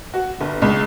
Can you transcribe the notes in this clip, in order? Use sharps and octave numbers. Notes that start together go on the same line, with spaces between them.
F#4
G1
C#2